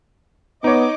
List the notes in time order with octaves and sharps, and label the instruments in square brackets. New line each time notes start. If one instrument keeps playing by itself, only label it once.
[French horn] B3 [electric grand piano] D#4 C#5 [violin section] D#5 D6